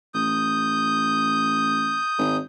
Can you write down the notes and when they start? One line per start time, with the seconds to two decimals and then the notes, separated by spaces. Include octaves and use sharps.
0.14 A1 D#6 G6
2.18 G#1